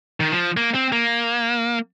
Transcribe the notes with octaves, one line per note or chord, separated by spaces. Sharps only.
D#3
F3
A#3
C4
A#3